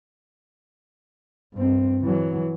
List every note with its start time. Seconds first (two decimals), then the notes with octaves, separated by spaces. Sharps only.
1.54 G2 C4
2.02 E3 F#3